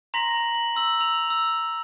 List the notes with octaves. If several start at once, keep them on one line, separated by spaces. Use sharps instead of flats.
A#5 C6 A#6 B6 F#7
F#7
C6 E6 F#7
E6 F7
E6